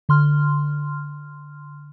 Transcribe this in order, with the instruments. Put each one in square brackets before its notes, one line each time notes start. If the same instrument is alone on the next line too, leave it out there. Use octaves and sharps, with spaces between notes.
[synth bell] D3 C6 F6